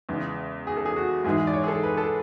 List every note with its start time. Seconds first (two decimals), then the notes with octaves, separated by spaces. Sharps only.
0.09 E2 C#3 G#3
0.67 G#4
0.77 A4
0.86 G#4
0.96 F#4
1.24 G#2 E3 G#3 G#4
1.47 D5
1.53 C#5
1.64 G#4
1.68 A4
1.83 B4
1.97 A4